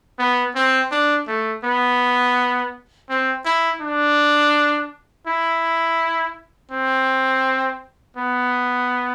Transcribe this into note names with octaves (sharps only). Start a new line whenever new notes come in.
B3
C4
D4
A3
B3
C4
E4
D4
E4
C4
B3